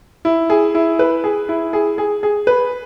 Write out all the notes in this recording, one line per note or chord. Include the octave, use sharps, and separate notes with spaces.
E4
G#4
E4
B4
G#4
E4
G#4
G#4
G#4
B4